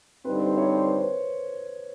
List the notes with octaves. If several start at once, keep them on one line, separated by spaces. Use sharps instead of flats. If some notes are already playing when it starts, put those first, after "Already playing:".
G2 D3 G3 C4 D#4 B4
C5
C#5
C5
B4
C5